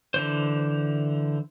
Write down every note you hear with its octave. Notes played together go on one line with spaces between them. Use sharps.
D3 E3 C5